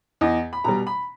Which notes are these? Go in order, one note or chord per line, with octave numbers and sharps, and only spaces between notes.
E2 D#5
B5
B2 G3 A#5
B5